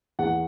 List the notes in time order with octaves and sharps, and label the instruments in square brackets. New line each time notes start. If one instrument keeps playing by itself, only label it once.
[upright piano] E2 F#5